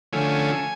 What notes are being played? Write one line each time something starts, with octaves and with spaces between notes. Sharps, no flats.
D3 F3 A3 C#4 G#5